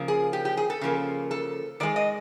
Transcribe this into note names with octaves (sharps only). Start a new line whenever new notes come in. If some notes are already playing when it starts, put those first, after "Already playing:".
Already playing: C#3 F3 A#3
G#4
G4
G4
G#4
A4
C#3 F3 A#3
A4
D#3 G#3 D5
D#5